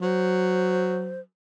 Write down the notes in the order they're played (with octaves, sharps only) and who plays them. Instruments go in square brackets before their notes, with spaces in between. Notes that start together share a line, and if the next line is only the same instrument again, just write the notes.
[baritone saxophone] F#3 [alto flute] C5